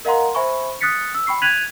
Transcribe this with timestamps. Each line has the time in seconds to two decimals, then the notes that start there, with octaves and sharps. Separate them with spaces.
0.05 A#4 D#5 F5 F#5 A#5 C6
0.35 C5 E5 G#5 B5 C#6
0.81 D#6 F#6 A6 B6 C#7
1.15 E6
1.27 G5 B5 C#6 C7
1.42 F#6 G#6 B6 D#7 F7 F#7